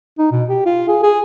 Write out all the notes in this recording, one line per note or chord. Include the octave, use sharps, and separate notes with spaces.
D#4
B2
G4
F4
G#4
G#4